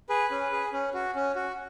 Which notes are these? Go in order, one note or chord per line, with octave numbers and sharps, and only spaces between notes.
G#4 B4
C#4
G#4
C#4
F#4
C#4
F#4